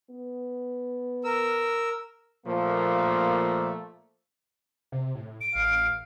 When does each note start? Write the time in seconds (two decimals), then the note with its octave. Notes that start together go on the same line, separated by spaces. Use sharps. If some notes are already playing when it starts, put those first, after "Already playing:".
0.10 B3
1.24 A#4 E6
2.46 A#2 F3 A3 A#3
4.92 C3
5.15 A2
5.41 D7
5.55 A1 F5